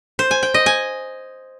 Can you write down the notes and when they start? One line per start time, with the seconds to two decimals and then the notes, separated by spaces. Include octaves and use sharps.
0.19 C5
0.31 G#5
0.43 G5
0.54 D#5
0.66 G#5